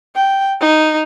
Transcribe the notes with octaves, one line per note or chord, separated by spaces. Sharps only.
G5
D#4